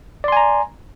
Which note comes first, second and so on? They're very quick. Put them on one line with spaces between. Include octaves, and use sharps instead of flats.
D5 C6 G#5 A#5